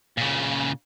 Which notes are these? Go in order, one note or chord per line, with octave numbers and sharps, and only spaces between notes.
A#2 C#3